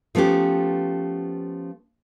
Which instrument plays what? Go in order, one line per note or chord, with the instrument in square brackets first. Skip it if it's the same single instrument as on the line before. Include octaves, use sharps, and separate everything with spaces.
[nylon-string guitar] F3 A3 B3 C#4 G4